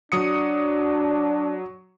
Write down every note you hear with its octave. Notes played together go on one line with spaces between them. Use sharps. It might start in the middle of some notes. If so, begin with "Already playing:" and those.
F#3 D4 D#6 C#7